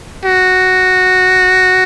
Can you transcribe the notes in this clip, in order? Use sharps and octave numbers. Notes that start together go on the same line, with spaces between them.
F#4